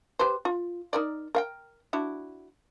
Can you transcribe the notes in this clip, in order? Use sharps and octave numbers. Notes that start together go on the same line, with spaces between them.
G4 B4 C5
F4
D#4 A#4 D5
A#4 F5 G5
D4 E4 F#4